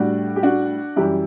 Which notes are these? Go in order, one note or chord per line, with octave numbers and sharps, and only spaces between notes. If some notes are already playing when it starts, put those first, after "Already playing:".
Already playing: A2 G3 D4 F#4
G4
D4 F#4
F#2 E3 G3 E4 G4